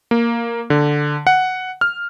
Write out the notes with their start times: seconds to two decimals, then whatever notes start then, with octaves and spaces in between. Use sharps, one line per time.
0.11 A#3
0.70 D3
1.27 F#5
1.81 F6